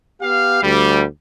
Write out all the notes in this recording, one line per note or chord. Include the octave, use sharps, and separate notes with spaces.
B3 G4 F5
D2 G3